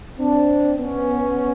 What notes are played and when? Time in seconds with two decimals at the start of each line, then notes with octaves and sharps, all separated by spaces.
0.19 C4 D4
0.79 B3 C#4